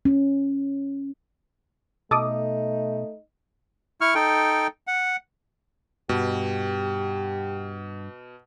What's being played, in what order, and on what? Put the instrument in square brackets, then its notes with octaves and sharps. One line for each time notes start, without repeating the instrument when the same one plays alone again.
[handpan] C#4
[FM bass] B2 [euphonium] A3 [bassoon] D#4 [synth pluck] A4 D6 D#6
[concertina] E4 C#6 F6
D#4 A4 G5
F#5
[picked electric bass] G2 [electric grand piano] B2 [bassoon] G4